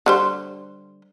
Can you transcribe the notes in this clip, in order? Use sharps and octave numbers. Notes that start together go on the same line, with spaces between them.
D3 G3 C5